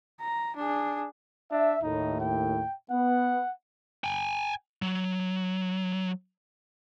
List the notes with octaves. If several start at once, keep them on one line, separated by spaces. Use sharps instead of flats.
A#5
D4 G#4
D4 E5
D#2 A2 D#4
G5
B3 F#5
G5 G#5
F#3